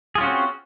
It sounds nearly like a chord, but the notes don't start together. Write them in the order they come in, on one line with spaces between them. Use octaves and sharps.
G#4 F4 C#4 F#4 C4